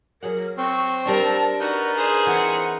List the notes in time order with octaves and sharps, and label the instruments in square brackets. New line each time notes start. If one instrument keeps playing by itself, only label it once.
[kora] F#3 G#4 F#5 [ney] A#4
[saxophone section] C4 [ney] C#6
[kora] G3 D4 [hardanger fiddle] A#4 [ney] A5
[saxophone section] D#4 A#4 B4 [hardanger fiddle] F#4 [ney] D5
[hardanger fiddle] G#4 C5
[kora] E3 C4 [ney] F#5